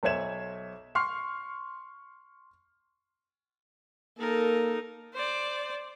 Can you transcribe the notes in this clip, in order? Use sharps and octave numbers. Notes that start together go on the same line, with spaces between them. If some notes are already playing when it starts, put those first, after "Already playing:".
B1 C5 C#5 E5 G#6 E7
C6 C#6 F6 C7
A#3 D#4 A4 A#4
C5 D5